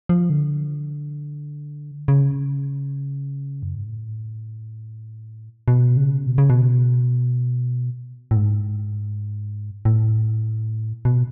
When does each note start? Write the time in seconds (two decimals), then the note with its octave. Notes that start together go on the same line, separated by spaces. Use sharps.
0.09 F3
0.30 D3
2.08 C#3
3.63 F#2
3.75 G#2
3.88 A2
5.68 B2
5.97 C#3
6.27 B2
6.38 C#3
6.50 B2
8.31 A2
8.36 G#2
9.85 A2
11.05 B2